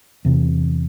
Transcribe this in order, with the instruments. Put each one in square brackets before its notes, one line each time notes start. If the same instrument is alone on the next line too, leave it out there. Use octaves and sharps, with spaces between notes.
[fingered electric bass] E2 C3